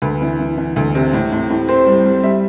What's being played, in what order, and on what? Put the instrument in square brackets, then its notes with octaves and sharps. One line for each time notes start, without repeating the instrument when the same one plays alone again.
[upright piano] D2 B4
E3
E3
E3
D2
C3
A2
A2
A2
C4 C5
G3
G3
G3 E5